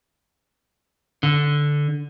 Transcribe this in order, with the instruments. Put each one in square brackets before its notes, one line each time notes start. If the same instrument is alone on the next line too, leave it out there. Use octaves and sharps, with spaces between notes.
[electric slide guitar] D3